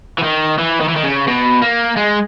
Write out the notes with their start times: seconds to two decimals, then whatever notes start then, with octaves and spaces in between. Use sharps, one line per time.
0.18 E3
0.23 D#3
0.58 E3
0.81 D#3
0.89 E3
0.96 D#3
1.04 C#3
1.28 B2
1.62 A#3
1.97 G#3